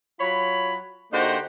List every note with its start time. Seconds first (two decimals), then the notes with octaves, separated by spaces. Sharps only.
0.20 F#3 F4 C#5 B5
1.12 D3 A#3 D#4 F#4 G4 C5